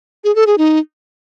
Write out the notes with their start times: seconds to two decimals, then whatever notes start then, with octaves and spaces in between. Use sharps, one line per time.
0.24 G#4
0.36 A4
0.47 G#4
0.58 D#4